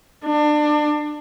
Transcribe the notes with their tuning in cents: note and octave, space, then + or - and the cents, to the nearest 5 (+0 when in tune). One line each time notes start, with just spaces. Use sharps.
D4 +25